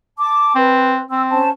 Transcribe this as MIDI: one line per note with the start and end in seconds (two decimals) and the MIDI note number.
0.19 0.53 81
0.19 0.53 86
0.56 1.02 60
0.56 1.01 71
1.11 1.40 60
1.11 1.24 88
1.31 1.49 61
1.31 1.49 72
1.31 1.49 81